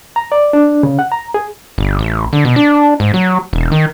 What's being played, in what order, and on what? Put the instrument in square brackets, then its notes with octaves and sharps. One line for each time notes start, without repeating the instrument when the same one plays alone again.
[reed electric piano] A#5
D5
D4
C#3
F#5
A#5
G#4
[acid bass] G1
A1
D3
B2
D4
G#2
F#3
E1
D#3